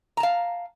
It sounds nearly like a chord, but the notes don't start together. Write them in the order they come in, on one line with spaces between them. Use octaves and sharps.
A#5 A5 F5